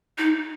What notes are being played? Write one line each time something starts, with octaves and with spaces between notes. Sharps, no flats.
D#4